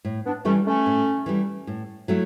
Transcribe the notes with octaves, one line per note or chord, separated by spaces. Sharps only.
A2
B3 D4
E3 G3 A3 C#4
A3 C#4
A2
E3 G3
A2
F#3 A3 E4